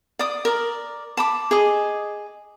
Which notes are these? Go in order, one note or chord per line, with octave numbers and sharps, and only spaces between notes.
D5 D#6
A#4 D5
A5 B5 D6
G#4 D#5 D6